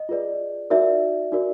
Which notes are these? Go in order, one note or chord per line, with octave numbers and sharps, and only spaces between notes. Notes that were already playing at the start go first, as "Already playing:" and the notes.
Already playing: D#5
F4 G#4 B4 D5
D#4 F#4 A#4 D5 E5
D#4 F#4 A#4 D5